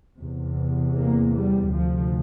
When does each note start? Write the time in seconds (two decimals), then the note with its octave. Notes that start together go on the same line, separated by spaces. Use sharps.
0.21 E2 C3
0.98 A#3
1.37 G3
1.76 D2 C3 F3